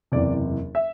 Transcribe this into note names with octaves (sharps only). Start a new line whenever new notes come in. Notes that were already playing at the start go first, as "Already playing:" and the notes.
F#1 E2 C3 D5
E5